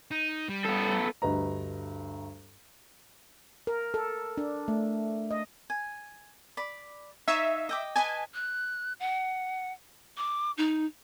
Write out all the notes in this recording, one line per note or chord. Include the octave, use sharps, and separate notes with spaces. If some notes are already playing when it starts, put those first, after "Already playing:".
D#4
G3
B3 A4
D2 G2 B4 D#5 A#5
A#4
A4
D4
A3
D#5
G#5
D5 B5
D#4 C#5 E5 F5
D#5 G5 D6
B4 D#5 G#5 A5
F#6
F#5
D6
D#4